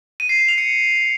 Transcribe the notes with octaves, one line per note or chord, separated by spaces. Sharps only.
D#7
C7
E7
F7
C#7